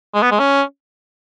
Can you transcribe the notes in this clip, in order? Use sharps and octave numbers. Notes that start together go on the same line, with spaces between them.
G#3
B3
G#3
C#4